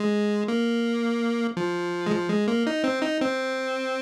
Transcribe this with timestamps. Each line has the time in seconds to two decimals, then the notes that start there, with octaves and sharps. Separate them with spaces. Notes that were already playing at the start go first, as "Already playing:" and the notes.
Already playing: G#3
0.48 A#3
1.57 F3
2.06 G#3
2.12 F3
2.29 G#3
2.48 A#3
2.67 D#4
2.84 C4
3.02 D#4
3.21 C4